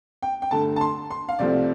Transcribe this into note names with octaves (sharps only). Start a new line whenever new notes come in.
G5
G5
G2 D3 A3 A5
A5
C6
C6
F5
C2 C3 F3 A3 D5